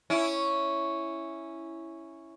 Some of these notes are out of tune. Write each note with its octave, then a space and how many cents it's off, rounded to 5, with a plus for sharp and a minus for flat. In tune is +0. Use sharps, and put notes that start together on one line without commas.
C#4 +0 E4 +0